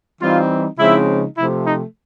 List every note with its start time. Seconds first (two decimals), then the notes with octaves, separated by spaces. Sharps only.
0.21 E3 G3 C4 D#4 F4
0.79 C#3 F3 G#3 C4 D#4 E4
1.37 C3 F3 A3 E4
1.67 D#4